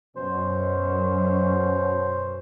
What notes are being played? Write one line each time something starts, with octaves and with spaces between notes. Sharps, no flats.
F#2 B2 C#4 C5